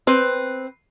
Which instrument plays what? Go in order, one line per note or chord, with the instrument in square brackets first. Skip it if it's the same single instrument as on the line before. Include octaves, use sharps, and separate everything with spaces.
[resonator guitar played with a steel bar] C4 B4